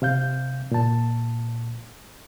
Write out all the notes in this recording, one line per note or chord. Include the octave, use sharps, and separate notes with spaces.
C3 F5 G6
A#2 A5